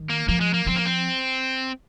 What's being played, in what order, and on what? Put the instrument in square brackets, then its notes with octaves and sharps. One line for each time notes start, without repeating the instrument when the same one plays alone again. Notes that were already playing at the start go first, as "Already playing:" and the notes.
Already playing: [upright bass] D#3
[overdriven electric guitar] A#3
[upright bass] F3 [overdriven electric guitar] A#3
[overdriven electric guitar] G#3
A#3
[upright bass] F3 [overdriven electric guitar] C4
[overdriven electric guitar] A#3
C4